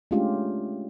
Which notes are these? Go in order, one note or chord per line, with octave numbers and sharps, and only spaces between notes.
G#3 A3 C#4 D4 F4 G4